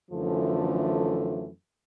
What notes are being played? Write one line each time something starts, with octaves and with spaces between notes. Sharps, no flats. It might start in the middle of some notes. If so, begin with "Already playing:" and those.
F#2 D3 E3 F3 A3